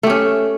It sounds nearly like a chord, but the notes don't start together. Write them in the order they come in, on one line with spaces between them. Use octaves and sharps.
A3 G4 C#4